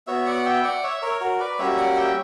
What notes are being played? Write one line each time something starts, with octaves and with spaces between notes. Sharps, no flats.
B3 F#4 C#5 E5
D5 F#5
E5 G5
D5 F#5
C#5 E5
A#4 C#5
F#4 A#4
B4 D5
G3 A#3 C#4 F#4 C#5 E5
D5 F#5
E5 G5